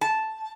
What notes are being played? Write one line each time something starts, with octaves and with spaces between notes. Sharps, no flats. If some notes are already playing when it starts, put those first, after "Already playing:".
A5